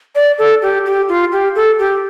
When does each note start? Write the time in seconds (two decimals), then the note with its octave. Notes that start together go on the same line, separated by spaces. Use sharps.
0.15 D5
0.38 A4
0.62 G4
0.86 G4
1.08 F4
1.32 G4
1.56 A4
1.79 G4